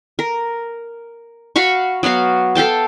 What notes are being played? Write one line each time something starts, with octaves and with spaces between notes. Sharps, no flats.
A#4
F#4 F5 B5 C#6
F#3 B3 F#4 F5
A4 F5 G5 A5